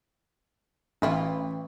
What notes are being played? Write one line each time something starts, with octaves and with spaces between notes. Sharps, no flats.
A1 C#4 E4 F4